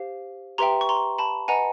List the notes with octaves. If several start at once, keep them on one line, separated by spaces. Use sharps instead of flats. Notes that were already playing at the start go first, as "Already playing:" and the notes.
Already playing: G4 C5 F5
G4 B4 E5 G5 A#5 C6
C#6
A#5 C6
A5 B5
B4 D#5 F#5 G#5 A#5